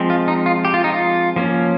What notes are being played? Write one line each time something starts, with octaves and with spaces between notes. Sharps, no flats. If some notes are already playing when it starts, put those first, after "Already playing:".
Already playing: F3 G#3 C4
F4
D#4
F4
G4
F4
D#4
F4
F3 A#3 C#4